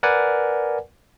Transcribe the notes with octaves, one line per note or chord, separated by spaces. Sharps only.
A#4 B4 D5 F#5 G#5